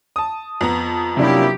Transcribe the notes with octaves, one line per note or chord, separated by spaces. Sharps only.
A5 D#6
F2 B3 A#5
C3 F#3 A#3 C#4 D4 E4 G4